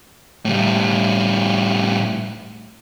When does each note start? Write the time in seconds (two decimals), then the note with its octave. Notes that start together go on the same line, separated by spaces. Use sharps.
0.45 A2 G3